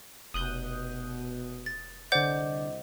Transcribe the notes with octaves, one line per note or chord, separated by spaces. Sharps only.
F1 B2 D#6 F#6 G6
A6
C2 D3 C5 D5 D#5 F#5 G6